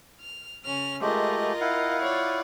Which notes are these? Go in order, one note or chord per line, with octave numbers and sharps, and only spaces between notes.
F6
C#3 C#4 F6
G#3 A3 F4 G4 A#4 D#5
E4 F5 F#5
F4 C#5 D5